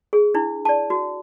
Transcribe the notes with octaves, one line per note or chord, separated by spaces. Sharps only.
G#4
D4 E4
D5 A5
F#4